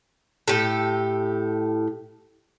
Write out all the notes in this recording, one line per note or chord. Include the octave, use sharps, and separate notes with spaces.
A2 G4 A4